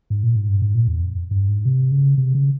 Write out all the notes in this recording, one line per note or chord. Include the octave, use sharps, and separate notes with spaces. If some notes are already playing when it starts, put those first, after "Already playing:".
G#2
A#2
G#2
G2
G#2
A#2
E2
F2
G2
G#2
C3
C#3
C3
C#3